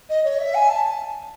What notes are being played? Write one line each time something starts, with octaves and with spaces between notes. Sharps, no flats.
D#5
C#5
E5
G#5
A5